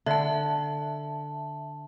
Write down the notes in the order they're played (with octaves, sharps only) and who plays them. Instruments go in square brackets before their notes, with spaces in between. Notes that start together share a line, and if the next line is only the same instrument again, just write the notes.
[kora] D3 [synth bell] E5 A5